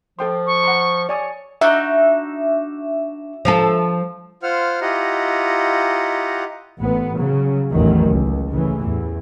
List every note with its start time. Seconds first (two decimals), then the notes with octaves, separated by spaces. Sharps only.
0.19 F3 A4 G5 C6
0.47 C#6
0.64 F#5 A#5 C6
1.09 C#5 D5 G#5 D#6
1.61 D4 D#4 F#4 E5
3.45 F3 F4 A4
4.43 F4 C5 F#5 F6
4.81 E4 F4 G4 D#5 F#5 A#5
6.80 A1 B3
7.19 C#3 F#3
7.72 A1 E2 D#3 F#3
8.09 C#2
8.51 A1 C#3 E3
8.83 E2 A2